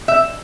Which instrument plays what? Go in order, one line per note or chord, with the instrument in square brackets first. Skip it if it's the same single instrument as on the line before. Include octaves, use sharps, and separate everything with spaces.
[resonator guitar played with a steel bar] E5